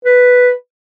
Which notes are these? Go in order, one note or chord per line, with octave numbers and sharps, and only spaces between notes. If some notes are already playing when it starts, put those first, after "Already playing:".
B4